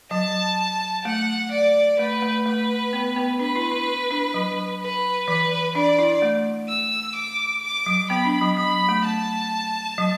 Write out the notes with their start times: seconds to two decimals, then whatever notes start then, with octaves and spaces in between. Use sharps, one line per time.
0.11 F#3 A5
1.05 A3 F#5
1.52 D5
1.99 A3 B4
2.22 A3
2.46 A3 B4
2.93 B3
3.16 B3
3.39 D4 B4
3.56 E4
3.71 E4
4.11 D4
4.34 F#3
4.81 B4
5.27 E3 B4
5.75 D4 D5
5.99 E4
6.22 A3
6.68 E6
7.16 D6
7.63 D6
7.86 F#3
8.10 B3 B5
8.25 D4
8.42 F#3
8.57 F#3 B5
8.89 A3
9.04 A5
9.98 F#3